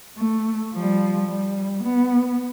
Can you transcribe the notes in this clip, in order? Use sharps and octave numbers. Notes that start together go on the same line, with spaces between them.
A3
F3 G3
G3
B3